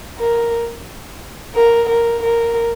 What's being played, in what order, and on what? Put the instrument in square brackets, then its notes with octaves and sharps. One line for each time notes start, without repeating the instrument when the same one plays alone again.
[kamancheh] A#4
A#4
A#4
A#4